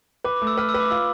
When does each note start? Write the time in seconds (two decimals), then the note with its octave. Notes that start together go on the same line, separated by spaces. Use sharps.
0.24 B4 D6
0.36 D6
0.42 A3
0.47 E6
0.57 B4 F6
0.69 E6
0.74 B4
0.80 D6
0.90 F4 E6